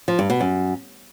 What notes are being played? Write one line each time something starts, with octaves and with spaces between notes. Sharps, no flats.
F3
G2
B2
F#2